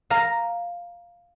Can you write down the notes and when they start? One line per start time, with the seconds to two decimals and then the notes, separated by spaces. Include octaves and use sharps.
0.10 F5 A#5